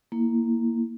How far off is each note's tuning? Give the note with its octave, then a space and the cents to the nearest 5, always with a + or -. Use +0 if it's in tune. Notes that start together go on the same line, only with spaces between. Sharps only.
A#3 +0 E4 +0